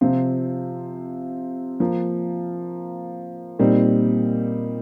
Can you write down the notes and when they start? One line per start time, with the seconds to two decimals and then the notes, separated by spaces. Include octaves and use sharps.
0.01 C3 F3 C4 F4
1.80 F3 A#3 F4
3.59 A#2 G3 C4 D#4